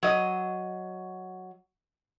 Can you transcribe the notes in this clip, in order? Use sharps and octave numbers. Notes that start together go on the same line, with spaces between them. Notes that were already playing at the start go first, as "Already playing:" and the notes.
F#3 D#5